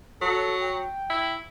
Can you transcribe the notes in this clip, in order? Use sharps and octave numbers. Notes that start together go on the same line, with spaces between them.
F#3 A4
G5
E4